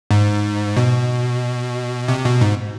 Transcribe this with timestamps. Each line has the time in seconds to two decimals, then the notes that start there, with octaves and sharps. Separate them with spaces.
0.11 G#2
0.77 B2
2.08 C3
2.25 B2
2.41 G#2